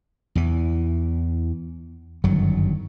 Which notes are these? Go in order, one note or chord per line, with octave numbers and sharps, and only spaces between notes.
E2 E3
G1 F#2 D#3 F#3